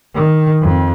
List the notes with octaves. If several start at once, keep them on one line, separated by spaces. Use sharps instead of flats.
D#3
F2